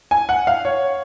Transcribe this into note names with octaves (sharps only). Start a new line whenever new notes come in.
G#5
F#5
F5
C#5